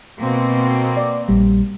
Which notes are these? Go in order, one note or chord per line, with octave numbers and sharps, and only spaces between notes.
B2 A#3 C4
D5
A#1 G3